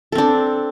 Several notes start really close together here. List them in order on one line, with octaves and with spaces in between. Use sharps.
A4 C4 D4